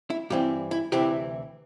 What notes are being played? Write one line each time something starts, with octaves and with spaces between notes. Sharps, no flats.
E4
G2 E3 G3 C4 E4 G4
E4
D2 C3 E3 C4 E4 G4